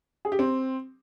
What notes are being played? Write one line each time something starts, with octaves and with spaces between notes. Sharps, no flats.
G#4
G4
C4